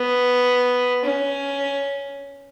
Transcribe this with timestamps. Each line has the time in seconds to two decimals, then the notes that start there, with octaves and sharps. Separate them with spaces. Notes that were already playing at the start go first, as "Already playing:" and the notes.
Already playing: B3
1.04 C#4